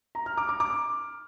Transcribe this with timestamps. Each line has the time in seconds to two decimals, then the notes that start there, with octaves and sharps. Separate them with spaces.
0.15 A#5
0.26 F6
0.37 D6
0.49 D6
0.60 D6